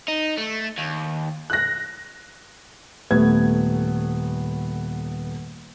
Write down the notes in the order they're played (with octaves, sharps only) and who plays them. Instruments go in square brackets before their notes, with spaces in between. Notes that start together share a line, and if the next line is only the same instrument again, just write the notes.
[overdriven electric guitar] D#4
A3
D#2
[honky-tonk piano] F#6 A#6
[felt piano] D#1 A3 B3 G#6